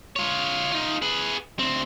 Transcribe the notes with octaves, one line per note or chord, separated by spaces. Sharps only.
F4 C#5
D#4 F4
G#4 B4
D2 C4